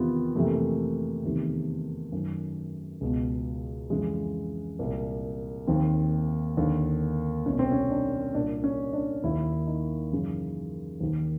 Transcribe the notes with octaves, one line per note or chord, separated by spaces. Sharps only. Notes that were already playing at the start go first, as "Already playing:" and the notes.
Already playing: E2 C3 D#3 B3 F4
F2 C3 E3 A3
A#3
A3
E2 C3 D#3
F#2 D#3
C#2 B2
F2 C#3 E3 G#3
C2 A#2
D#2 D#3 C4
D#2 D3
C2 B2 C#4
C4
C#4
D4
C2 A#2 D4
C#4
D4
D#2 D#3 E4
D#4
F#2 C#3 E3
D#2 D#3